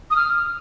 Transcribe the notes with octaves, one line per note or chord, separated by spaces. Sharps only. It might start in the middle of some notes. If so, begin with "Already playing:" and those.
D#6
F6